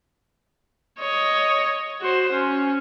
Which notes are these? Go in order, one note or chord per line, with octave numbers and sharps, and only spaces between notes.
C#5 D#5
F#4 C5
C#4